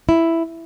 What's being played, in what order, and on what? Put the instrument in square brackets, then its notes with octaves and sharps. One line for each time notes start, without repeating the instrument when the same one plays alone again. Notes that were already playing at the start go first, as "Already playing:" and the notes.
[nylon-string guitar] E4